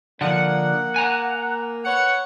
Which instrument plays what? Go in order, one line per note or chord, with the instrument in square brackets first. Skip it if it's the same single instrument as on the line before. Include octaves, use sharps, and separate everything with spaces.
[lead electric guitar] D3 F3 [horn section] A#3 [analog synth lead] F#5
[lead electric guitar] G#5 A#5
[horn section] B4 C#5 [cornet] F#5 [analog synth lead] C#7